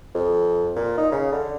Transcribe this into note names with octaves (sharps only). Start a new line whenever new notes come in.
F2
A#2
D#4
C#3
D3